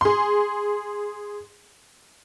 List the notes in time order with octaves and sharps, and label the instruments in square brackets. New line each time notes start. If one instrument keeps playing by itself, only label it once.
[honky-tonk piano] G#4 C6